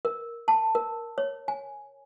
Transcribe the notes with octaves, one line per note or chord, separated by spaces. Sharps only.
A#4
A5
A#4
C#5
G#5